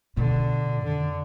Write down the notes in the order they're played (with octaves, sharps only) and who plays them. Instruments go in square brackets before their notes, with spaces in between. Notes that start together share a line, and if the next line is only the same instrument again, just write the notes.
[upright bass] B2 [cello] D3
[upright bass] F2 [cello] D3